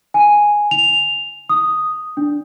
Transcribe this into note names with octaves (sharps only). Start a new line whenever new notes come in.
G#5
F7
D#6
D4